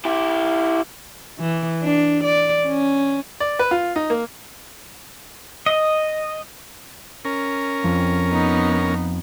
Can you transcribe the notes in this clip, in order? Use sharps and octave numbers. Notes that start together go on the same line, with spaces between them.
E4 G4
E3
D4
D5
C#4
D5
B4
F4
D#4
A#3
D#5
C#4 A#4
F2
B3 D#4